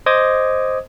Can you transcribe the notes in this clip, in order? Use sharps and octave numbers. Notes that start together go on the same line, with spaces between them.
C5 D#5 D6 D#6 G#6